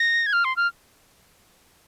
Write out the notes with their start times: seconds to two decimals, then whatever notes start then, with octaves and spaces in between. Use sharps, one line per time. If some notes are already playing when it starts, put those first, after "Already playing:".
Already playing: A#6
0.26 G#6
0.33 F6
0.45 C6
0.56 F6